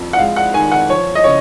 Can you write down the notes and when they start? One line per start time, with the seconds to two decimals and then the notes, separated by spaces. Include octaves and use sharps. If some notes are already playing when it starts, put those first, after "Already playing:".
Already playing: F2
0.13 F#5
0.18 G#3 F5
0.36 F#5
0.54 D#3 G#5
0.72 F#5
0.89 F3 C#5
1.15 D#5
1.24 C#3 C#5